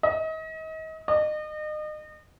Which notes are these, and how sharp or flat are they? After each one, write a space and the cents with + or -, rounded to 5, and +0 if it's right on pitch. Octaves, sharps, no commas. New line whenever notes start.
D#5 +35
D#5 -35